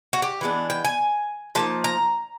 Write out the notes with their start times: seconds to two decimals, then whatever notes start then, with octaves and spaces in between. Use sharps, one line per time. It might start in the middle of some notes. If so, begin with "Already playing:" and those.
0.13 F#4
0.22 G4
0.41 E3 G#3 B3 D4
0.70 G5
0.85 G#5
1.55 F3 A#3 D#4 A5
1.84 A#5